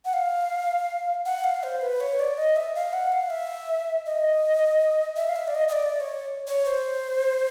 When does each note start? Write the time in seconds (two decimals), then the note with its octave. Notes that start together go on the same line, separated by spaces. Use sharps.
0.05 F#5
0.13 F5
1.25 F#5
1.44 F5
1.63 C5
1.81 B4
2.00 C#5
2.19 D5
2.37 D#5
2.56 E5
2.75 F5
2.93 F#5
3.12 F5
3.30 E5
4.06 D#5
5.16 E5
5.29 F5
5.36 E5
5.47 D5
5.55 D#5
5.68 D#5
5.72 D5
6.00 C#5
6.47 C#5
6.65 C5